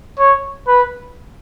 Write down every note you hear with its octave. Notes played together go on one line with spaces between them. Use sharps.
C#5
B4